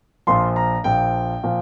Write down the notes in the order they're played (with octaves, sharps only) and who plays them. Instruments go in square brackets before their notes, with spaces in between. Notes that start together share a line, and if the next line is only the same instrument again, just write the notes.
[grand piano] A#1 A#2 F3 C6
A#5
A#1 A#2 F3 G5
A#2 F3